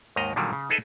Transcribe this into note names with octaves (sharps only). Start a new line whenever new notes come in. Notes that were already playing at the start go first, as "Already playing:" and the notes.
D#2 G#2 D#3 D#5 A#5
A#2 D3 D#3 F#3 G3
C#3
D#4 G#4 A4 B4 D#5 E5